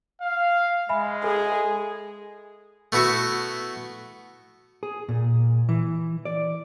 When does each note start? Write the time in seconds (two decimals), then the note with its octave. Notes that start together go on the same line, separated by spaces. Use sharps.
0.21 F5
0.89 G#3 E5 G#5 B5
1.24 G#4 A4
2.92 A3 B3 E4 F#4
4.83 G#4
5.09 A#2
5.69 E3
6.25 D5